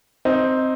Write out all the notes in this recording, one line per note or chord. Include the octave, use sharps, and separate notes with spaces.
C4 D#4